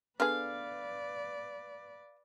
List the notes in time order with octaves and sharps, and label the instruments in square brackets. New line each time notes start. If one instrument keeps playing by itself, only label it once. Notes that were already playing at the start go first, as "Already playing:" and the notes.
[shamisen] D3 B3 G#4 [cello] B4 D5 [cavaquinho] F5